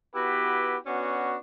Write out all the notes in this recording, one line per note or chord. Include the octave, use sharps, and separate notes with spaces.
B3 E4 F#4 G4 B4
B3 C#4 D4 F#4